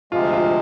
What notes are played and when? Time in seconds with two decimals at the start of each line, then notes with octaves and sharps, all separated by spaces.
0.12 D2 C3 F3 G#3 F4
0.33 F4